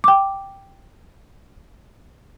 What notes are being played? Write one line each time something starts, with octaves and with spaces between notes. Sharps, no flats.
G5 D6